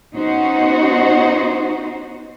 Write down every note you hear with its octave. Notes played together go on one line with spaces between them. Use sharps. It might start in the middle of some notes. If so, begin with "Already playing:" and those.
B3 C#4 D#4 F#4 C5